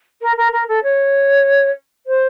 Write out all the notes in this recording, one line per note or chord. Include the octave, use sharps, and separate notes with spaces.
A#4
A#4
A#4
A4
C#5
C5